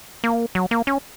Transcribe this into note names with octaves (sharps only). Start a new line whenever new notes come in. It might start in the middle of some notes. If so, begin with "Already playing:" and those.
A#3
F#3
A#3
C#4